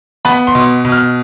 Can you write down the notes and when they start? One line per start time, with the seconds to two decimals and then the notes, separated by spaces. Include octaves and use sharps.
0.25 B3 B5
0.47 C6
0.55 B2
0.85 B2
0.92 F6